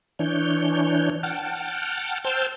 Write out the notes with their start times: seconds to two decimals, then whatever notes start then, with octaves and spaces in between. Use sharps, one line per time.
0.19 E3 D4 C#5 G6
1.23 F#5 G5 A5 F6
2.24 C5 G5 A5 E6 F6 G6